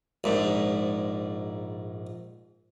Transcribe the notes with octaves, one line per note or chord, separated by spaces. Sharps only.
A#1 G#2